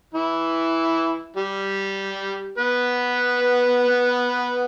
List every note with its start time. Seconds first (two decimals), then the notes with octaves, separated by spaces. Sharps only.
0.14 E3 E4
1.36 G3 G4
2.58 B3 B4